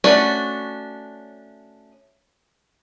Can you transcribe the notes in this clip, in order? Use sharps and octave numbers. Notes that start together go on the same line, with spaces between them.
A3 C#4 D4 F#4